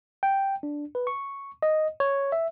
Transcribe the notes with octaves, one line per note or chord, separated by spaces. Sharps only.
G5
D4
B4
C#6
D#5
C#5
E5